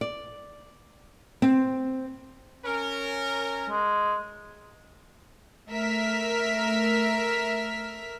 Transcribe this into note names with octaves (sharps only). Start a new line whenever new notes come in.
D5
C4
C#4 A#4
G#3
A3 A#4 E5 F6 B6